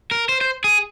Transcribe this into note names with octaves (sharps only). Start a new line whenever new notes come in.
A#4
C5
C5
G#4